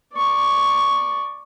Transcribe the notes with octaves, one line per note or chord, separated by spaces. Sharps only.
D5 C#6